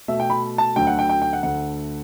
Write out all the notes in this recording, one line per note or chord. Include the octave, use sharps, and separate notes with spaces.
B2 A3 E5
G5
B5
A5
D2 D3 F#3 A3 G5
F#5
G5
G5
G5
F#5
D2 D3 A3 F#5